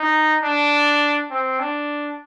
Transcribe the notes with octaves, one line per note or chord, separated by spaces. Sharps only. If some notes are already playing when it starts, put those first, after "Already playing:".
Already playing: D#4
D4
C4
D4